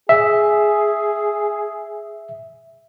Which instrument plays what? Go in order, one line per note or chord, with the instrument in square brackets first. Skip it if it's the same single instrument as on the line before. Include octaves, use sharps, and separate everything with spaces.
[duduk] G#4 [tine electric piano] E5